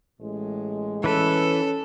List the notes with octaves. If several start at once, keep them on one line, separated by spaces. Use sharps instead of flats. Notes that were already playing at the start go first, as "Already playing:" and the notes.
A1 A2 G#3
E3 C#4 A4 B4